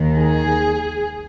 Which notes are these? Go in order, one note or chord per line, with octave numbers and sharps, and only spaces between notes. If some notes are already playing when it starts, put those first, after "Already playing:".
Already playing: D#2 D#3
G#4